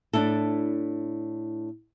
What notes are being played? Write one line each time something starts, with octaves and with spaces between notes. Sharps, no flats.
A2 D4 E4 A4